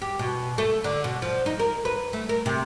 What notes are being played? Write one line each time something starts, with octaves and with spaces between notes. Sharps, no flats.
G4
B2
A3
D3
B2
F3
D#4
A#4
B4
A3
A#4
C3